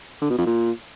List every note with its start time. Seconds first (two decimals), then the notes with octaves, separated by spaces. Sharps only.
0.22 D3
0.30 B2
0.38 F2
0.46 A#2